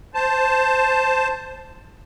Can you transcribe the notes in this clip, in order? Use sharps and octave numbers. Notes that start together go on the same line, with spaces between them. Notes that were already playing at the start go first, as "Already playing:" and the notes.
C5 A5